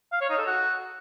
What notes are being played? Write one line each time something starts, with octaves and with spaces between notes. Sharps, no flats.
F5
C#5
D#4
A4
F#4